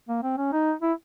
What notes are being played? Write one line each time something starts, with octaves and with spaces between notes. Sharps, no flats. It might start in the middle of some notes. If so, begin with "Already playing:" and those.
A#3
C4
C#4
D#4
E4